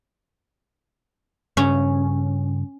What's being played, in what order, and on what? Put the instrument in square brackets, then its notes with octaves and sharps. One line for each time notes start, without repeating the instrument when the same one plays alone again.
[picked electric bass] G2 C#3 [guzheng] C#4